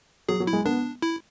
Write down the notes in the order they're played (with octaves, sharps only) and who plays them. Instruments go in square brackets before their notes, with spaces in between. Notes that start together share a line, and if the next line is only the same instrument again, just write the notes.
[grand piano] F#3 [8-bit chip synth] G#4
[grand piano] F#3
[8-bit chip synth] E4
[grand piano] G#3
[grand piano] B3 [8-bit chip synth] D4
[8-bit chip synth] E4